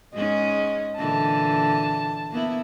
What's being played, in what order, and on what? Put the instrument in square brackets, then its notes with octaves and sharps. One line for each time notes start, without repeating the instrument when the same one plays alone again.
[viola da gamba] G#2 G#3 C#4 [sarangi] D#5
[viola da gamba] A#2 D3 E3 [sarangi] A5
[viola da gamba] A#3 B3 E4